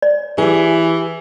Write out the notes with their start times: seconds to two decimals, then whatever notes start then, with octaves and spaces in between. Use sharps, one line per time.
0.02 D5
0.38 E3 G4 G#4